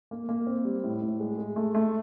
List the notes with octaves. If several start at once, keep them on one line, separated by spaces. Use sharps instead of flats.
A#3
A#3
C4
G3
A2
A2
G#3
G#3
A3
A3